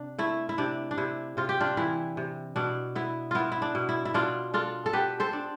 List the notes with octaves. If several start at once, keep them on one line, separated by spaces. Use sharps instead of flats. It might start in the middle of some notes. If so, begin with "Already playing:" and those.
Already playing: C3 D4
A3 E4
E4
C3 D4
D4
C3 E4
C3 F4
G4
D4 F4
E3 E4
C3
B2 D4
B3 E4
B3 E4 F4
E4
D4
B2
E4
E4
B2 D4 F4
D4 F4 A4
A4
B3 G4 B4
A4 C5
D4